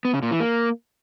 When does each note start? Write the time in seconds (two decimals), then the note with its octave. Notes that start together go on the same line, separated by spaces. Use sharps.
0.05 B3
0.14 C#3
0.22 A#2
0.31 E3
0.40 A#3